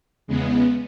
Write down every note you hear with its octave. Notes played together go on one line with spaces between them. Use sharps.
E2 C#3 G#3 B3